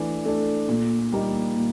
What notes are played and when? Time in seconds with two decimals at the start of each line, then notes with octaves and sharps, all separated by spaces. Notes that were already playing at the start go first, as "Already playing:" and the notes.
Already playing: E3 A3 D4
0.25 A3 D4
0.69 A#2
1.12 G3 A#3 D#4
1.56 A#2